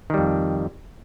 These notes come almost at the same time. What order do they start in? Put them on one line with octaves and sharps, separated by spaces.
D#3 G3 F2